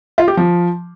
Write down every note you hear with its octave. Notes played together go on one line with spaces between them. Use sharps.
F4
G4
F3